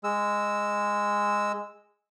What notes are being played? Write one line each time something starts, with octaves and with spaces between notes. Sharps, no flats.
G#3 E6